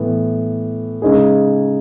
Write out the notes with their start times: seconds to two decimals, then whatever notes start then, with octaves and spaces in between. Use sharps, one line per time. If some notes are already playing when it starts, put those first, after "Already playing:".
Already playing: A2 E3 B3
1.02 C#3 G#3 D#4 G#4